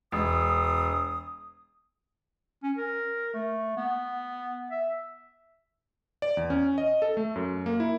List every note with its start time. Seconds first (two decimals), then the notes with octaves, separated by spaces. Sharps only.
0.12 E1 D#6
2.63 C#4
2.77 A#4
3.34 A3
3.77 B3
4.71 E5
6.22 D5
6.37 E2
6.50 C#4
6.78 D#5
7.02 A4
7.17 A3
7.36 F#2
7.66 A#3
7.80 E4